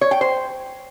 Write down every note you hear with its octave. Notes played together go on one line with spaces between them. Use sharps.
C#5
G5
C5